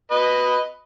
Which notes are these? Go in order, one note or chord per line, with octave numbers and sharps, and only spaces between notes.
B4 D#5